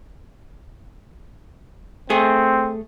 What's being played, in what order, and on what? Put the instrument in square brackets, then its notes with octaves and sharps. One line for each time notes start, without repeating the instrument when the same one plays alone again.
[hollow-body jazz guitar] A3 G#4 [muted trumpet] C4